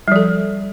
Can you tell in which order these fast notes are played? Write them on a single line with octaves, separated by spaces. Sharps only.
G3 F3 A4